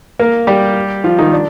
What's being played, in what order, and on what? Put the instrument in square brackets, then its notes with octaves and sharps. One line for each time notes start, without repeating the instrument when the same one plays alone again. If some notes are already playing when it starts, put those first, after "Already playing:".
[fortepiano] A#3 A#4
G3 G4
F3 F4
D#3 D#4
D4